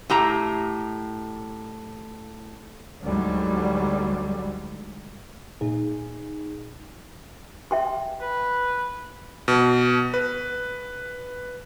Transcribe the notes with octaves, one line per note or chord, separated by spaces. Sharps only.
A2 G4 A#5
D2 G#2 D3 F#3 G3
A#2 D#4 G#4
E5 G5 C6
B4
B2
B4